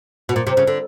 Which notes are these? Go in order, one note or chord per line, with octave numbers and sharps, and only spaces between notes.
B2
A#2
C3
C#3
D3